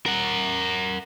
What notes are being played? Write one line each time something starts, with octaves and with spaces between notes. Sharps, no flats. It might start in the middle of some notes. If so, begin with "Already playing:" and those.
A#4 F#5